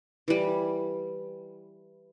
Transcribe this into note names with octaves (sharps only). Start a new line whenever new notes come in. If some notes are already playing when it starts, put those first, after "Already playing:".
E3 G3